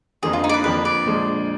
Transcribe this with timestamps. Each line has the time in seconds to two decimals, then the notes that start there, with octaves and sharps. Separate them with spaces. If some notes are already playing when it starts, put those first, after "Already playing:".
0.22 F2 D3 F3 A#3 D4 G#4
0.33 F4
0.44 D#4
0.49 D5
0.54 B4
0.64 F2 D3 F3 A#3 D4 B4
0.85 D5
1.06 A#2 F3 G#3 D4